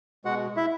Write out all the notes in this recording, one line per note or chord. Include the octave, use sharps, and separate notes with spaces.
B2 G#3 F#4 F#5
E4 E5